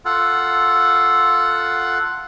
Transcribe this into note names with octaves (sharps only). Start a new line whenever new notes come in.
F4 A4 F#5